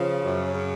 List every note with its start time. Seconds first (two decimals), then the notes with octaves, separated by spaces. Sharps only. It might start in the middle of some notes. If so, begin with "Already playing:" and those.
Already playing: C#3 F3
0.24 F#2
0.55 C#3